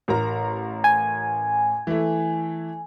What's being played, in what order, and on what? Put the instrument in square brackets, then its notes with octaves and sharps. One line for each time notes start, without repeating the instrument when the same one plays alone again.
[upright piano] A1 A#4 A#5
[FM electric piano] G#5
[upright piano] E3 A3